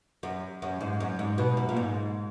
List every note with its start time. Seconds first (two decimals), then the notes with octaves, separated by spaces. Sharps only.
0.23 F#2
0.62 F#2
0.81 G#2
1.00 F#2
1.19 G#2
1.38 B2
1.57 F#2
1.69 A#2
1.76 G#2